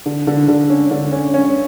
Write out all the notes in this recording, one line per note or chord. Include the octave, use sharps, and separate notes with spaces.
D3
D3
D3
C#4
D3
C#4
C#4